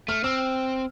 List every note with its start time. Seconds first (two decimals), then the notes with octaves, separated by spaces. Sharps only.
0.08 A3 F6
0.24 C4 E6